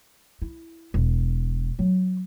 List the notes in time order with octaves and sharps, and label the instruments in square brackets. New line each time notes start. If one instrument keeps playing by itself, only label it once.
[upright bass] E4
E1
F#3